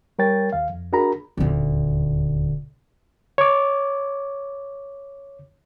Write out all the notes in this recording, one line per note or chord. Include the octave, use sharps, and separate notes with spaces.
G3 A#4 C#5 G5 A6
D#2 F5
F2
D4 F#4 G#4 A#4 A#5 B5
D#1 D2
C#5 D6